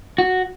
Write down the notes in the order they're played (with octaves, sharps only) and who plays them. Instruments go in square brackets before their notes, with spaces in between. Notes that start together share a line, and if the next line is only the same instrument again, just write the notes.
[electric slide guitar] F#4